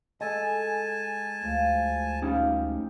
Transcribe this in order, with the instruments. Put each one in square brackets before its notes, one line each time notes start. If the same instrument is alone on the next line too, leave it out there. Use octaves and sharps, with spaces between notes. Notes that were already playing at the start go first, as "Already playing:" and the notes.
[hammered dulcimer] G#3 A4 [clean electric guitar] D#5 [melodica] G#5 A5
[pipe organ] D2 [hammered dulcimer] F3
[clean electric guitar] C#4 D#4 G4 [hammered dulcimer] F5